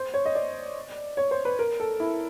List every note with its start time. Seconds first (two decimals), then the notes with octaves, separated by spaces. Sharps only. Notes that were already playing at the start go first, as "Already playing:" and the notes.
Already playing: C5
0.14 C#5
0.25 D#5
0.35 D5
1.17 C#5
1.31 C5
1.45 B4
1.59 A#4
1.80 A4
2.00 E4